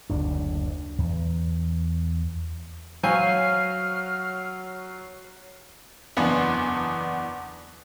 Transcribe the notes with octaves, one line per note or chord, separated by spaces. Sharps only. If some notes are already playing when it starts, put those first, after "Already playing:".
F#1 D2 D4
E2
F#3 C5 C#5 F5 G#5 F6 C7
F#1 E2 B3 D4 F#5 G#5